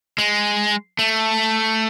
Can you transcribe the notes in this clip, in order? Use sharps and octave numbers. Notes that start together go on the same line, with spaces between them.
G#3
A3